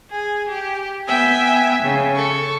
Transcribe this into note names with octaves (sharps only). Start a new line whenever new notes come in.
G#4
G4
B3 E5 G5 G#5
C#3
A4 C#6